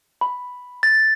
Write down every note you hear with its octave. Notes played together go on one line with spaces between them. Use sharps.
B5
A6